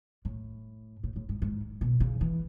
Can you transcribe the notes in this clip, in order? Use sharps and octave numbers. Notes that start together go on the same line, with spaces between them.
A2
A2
A2
G#2
G#2
B2
C#3
E3